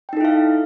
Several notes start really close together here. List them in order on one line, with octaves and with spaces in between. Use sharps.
G5 D#4 A4 E4 F5